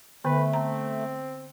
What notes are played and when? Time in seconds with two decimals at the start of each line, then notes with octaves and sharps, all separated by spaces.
0.25 D3 A3 B3 B4
0.53 C4 A#5